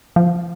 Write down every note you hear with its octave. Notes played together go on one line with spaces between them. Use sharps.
F3